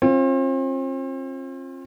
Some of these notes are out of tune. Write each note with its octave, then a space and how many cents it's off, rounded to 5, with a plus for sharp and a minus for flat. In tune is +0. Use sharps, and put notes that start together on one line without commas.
C4 +40 F4 +0